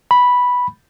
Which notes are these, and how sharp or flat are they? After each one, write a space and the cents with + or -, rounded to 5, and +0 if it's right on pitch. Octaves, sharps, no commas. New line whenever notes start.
B5 -5